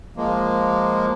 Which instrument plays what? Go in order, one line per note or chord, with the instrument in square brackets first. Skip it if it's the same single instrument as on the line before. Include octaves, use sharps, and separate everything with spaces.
[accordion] F3 G#3 A#3